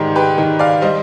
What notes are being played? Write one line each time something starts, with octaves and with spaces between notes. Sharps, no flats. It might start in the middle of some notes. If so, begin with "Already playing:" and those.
Already playing: G#2 D#3 G#3 G4 C5 D5
G4 B4
D#3
D5 F5
G3 C5 D#5